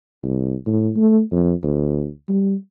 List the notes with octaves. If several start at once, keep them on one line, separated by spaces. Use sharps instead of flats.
C2
A2
A3
F2
D2
G3